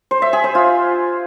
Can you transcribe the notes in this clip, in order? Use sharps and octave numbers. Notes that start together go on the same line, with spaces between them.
C5
E5
G#4
C5
F4